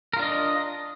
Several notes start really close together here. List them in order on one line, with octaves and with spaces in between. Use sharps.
A#4 F4 D4 D#5